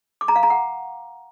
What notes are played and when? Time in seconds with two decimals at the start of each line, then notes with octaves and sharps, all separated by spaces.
0.21 D6
0.28 A#5
0.36 F5
0.43 A#5
0.50 F#5